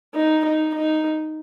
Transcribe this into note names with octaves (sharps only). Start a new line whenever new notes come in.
D#4
D#4
D#4